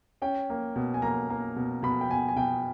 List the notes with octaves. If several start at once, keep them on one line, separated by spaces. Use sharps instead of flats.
C#4 G5
A#3
B2
G#5
A#3 A#5
A#3
B2
B2 B5
G5
B2 G#5
G#5
B2 G5